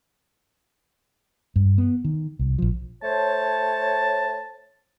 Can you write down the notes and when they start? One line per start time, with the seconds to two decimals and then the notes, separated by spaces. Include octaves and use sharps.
1.56 G2
1.78 B3
2.05 D#3
2.39 C2
2.58 A#1 F3
3.03 A3 C5 C#5 A5